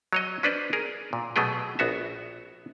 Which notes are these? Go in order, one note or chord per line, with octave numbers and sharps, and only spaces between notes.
F#3 C#5 D#5
C#4 D4 B4 C5 D5 D#5
G#4 A#4
A#2
B2 F#3 A3 B3 G#4 G5
A#1 B3 F#4 E5